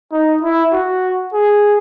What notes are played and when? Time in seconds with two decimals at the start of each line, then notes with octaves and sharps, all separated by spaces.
0.12 D#4
0.42 E4
0.73 F#4
1.33 G#4